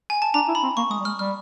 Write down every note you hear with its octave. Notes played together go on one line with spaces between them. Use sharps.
G#5
A5
D4 A#5
E4
B5
C4
A#3 C#6
G#3 D#6
G3
G#3 F6
G3 F6